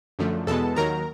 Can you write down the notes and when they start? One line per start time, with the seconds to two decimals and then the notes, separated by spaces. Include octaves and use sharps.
0.19 F#2 D3 F3 A3
0.47 E2 B2 G#3 B3 A4 A5
0.76 D#2 D#3 F#3 A#4 A#5